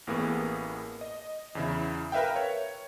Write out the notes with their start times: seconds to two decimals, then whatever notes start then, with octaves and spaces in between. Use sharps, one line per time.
0.07 A1 A2 A#3 B3 G#4
1.01 D#5
1.55 E2 C#3 E4
2.12 A#4 B4 E5 F5 G5
2.36 C#5